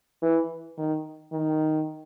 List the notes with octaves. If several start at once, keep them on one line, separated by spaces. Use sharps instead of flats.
E3
D#3
D#3